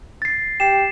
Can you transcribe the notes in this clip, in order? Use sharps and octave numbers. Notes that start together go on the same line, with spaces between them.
A6 C7
G4 C7 E7